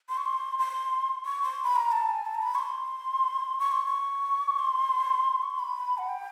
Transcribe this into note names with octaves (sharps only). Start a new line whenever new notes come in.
C6
C#6
C6
C6
C#6
C6
B5
A#5
A5
G#5
A5
A#5
B5
C#6
C6
C#6
C6
C#6
C6
C#6
C6
B5
F#5
G5